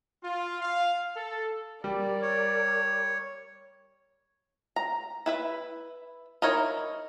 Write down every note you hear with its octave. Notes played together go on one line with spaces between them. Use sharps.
F4
F5
A4
G3 A#4 D5
C#5
A#5
E4 B4 E5
D#4 E4 A#4 C#5